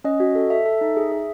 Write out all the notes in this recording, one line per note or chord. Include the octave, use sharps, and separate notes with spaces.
C#4 D#5
F#4
A4
A4 E5
A4
D#4
G#4
G#4